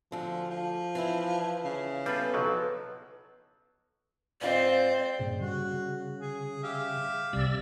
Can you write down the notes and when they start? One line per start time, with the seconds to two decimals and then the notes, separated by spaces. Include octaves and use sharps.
0.12 D2 D3 F3
0.51 F3
0.95 E3 D4 E4
1.65 C#3
2.06 G3 B3 F4 A4 B4
2.34 B1 F3 F#3
4.41 G#2 C4 F4 C5 D5 D#5
5.19 G2 A#2 C#3
5.41 G3 F#4
6.22 G#4
6.64 G4 E5 F5
7.33 C2 C3 G3 D5 E6